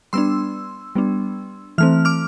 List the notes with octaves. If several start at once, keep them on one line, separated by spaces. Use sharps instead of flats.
G3 B3 D4 C6 E6
G3 B3 D4
E3 A3 C4 F6
D6 F6